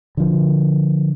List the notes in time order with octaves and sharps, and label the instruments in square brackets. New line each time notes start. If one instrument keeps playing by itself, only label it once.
[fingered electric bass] D3 F3